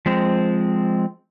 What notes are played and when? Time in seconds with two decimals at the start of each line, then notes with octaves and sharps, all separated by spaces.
0.06 F3 G#3 C4